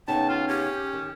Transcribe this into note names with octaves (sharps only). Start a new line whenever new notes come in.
C#3 B3 D#4 G5 A5
F4
C#4 G4
D#3